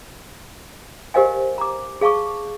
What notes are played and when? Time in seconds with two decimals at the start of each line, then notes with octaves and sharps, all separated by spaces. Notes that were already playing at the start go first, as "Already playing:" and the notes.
1.14 G4 A#4 C5 D#5 F5 G#5
1.58 A#5 D6
2.01 G#4 F5 A5 C#6 D6